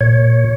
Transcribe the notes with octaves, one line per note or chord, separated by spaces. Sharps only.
A#2 C#5